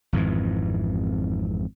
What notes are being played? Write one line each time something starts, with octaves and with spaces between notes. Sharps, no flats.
G#1 F2 G#2 E3